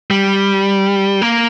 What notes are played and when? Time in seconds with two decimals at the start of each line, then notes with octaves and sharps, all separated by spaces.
0.11 G3
1.22 A#3